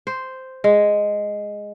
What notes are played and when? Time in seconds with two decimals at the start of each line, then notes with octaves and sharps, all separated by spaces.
0.07 C5
0.64 G#3